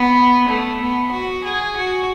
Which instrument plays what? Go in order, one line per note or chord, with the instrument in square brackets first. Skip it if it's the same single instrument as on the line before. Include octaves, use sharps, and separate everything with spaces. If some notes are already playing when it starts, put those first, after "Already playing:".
Already playing: [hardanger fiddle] B3
A3
B3
F#4
G#4
F#4